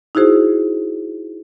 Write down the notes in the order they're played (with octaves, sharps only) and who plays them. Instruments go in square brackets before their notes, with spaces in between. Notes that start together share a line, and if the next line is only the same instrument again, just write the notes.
[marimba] D#4 E4 F#4 G#4 C5